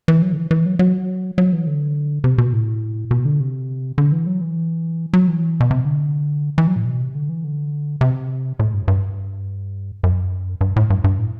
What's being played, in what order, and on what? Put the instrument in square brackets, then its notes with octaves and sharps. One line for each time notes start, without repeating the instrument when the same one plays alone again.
[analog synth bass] E3
F#3
D3
E3
E3
F#3
F#3
F#3
E3
D3
C3
B2
A2
B2
D3
C3
D3
E3
F#3
E3
F#3
E3
B2
C3
D3
E3
F#3
A2
B2
C3
D3
E3
D3
C3
A2
G2
G2
F#2
G2
A2
G2
G2
A2